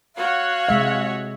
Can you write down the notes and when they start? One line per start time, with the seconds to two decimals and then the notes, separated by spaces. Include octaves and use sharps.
0.16 F#4 C#5 F5 F#5
0.69 C3 G#3 E5